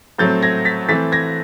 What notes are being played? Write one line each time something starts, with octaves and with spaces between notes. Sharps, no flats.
A2 F#3 A3 C4 G6 A6
G#6 A#6
A6 B6
E3 A3 C4 A6 B6
G#6 A#6